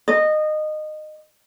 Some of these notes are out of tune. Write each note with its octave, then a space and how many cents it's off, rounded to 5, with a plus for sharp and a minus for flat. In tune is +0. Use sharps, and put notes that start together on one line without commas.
D#5 -20